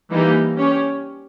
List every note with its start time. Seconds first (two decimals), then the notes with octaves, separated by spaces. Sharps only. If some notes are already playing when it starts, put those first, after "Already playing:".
0.11 E3 G3 A#3 D#4 G4
0.57 C#4 G4 C#5